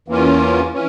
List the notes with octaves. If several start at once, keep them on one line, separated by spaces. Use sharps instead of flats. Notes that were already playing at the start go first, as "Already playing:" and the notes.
E2 E3 A#3 C#4 F4
E3 C#4